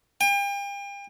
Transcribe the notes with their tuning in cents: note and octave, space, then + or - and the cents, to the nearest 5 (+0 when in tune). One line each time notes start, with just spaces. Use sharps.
G5 +40